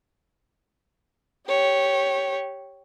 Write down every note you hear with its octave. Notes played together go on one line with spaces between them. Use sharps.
G4 C#5